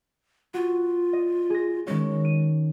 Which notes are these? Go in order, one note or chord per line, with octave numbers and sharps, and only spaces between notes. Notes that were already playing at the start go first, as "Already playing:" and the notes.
F4 F#4
D#5
G#4 A#6
D#3 G#3 C#4
D#7